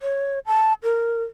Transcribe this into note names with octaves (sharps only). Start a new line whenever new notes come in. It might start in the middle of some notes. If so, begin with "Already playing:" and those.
C#5
A5
A#4